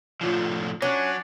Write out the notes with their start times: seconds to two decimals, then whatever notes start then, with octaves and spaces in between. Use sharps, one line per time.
0.21 A2 D3 F3 F4 C#5
0.82 F#3 C#4 D4